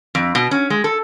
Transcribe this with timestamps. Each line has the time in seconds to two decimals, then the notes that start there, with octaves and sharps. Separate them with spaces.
0.15 F2
0.35 B2
0.51 C#4
0.70 G#3
0.84 A4